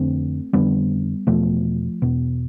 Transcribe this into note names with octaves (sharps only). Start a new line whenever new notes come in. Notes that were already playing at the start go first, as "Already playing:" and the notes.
Already playing: F2 D3 A3 C4
F2 D3 G3 B3
E2 B2 F3 A3
E2 B2